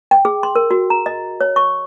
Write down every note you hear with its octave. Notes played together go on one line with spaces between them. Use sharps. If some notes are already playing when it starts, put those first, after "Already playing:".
G5
G#4
C6
A#4
F#4
A#5
D#5
C#5
C#6